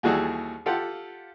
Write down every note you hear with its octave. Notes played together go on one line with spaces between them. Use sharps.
D#2 E3 G3 F#4 G#4 A4
F4 G4 A4 F5 F#5